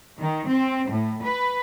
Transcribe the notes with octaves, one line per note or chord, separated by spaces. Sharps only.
D#3
C4
A2
B4